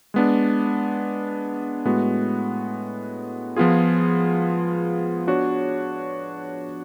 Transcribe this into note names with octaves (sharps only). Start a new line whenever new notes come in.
G#3 B3 D4
A2 G#3 B3 F#4
F3 B3 F4 G#4
B3 D4 F#4 C#5